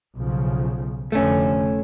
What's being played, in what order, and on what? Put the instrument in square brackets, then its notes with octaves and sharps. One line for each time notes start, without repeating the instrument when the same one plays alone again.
[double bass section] B1 C#3 F3
[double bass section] F1 F2 D3 [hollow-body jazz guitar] A3 C#4